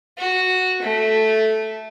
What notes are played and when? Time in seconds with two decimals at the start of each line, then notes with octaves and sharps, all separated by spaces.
0.18 F#4
0.82 A3